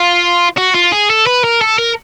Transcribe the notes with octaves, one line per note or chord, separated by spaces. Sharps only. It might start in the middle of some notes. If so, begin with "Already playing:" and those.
Already playing: F4
F#4
F4
G#4
A4
B4
A#4
A4
A#4